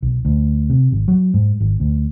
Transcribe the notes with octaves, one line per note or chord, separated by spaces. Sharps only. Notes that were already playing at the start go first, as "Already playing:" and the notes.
B1
D2
C3
G#1
F#3
G#2
G#1
D2